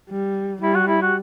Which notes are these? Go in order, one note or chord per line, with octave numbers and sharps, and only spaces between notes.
G3
G3 E4
F#4
E4
F#4